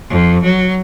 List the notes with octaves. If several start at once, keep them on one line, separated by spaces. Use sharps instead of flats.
F2
F#3